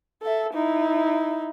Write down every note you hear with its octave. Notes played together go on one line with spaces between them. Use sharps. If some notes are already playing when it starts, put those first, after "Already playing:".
A4 E5
D#4 E4